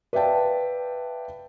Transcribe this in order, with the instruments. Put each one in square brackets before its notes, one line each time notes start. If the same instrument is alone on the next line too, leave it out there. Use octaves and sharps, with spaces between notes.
[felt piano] B4 D5 E5 F5 G5 A5